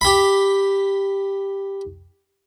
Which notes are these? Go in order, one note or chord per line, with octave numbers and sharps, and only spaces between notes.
G4 B5